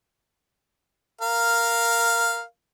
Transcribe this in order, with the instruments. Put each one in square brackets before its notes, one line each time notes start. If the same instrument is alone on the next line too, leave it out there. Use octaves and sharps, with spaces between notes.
[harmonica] A#4 F5